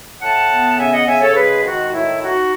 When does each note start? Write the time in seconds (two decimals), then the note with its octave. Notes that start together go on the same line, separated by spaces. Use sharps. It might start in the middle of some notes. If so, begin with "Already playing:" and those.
0.21 A2 F#5 A5
0.50 B3
0.78 C#3 E5 G#5
0.92 D#5 F#5
1.06 C#3 E5 G#5
1.21 A4 C#5
1.35 G#3 G#4 B4
1.64 D#3 F#4
1.92 A2 E4
2.20 D#4 F#4